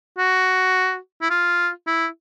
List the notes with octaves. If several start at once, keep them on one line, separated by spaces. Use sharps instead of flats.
F#4
E4
F4
E4